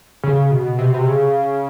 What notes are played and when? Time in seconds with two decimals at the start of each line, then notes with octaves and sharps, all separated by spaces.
0.23 C#3
0.51 B2
0.79 C3
0.86 B2
0.94 C3
1.06 C#3